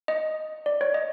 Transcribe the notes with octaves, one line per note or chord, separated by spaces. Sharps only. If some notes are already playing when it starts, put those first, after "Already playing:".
D#5
D5
C#5
D#5